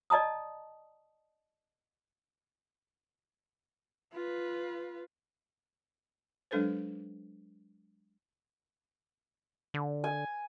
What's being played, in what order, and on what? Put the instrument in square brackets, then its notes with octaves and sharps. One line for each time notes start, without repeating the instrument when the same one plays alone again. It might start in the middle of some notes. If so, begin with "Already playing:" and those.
[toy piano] D5 D#5 A5 A#5 D#6
[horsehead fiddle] F4 B4
[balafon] F#3 G#3 D4 A4 B4 C5
[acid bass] D3
[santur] G#5